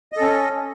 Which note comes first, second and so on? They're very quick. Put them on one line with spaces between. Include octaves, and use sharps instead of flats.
D#5 A4 C#4